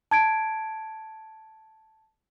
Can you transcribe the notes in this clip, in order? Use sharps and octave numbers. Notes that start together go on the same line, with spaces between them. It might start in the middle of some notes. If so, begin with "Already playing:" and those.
A5 G#6 D7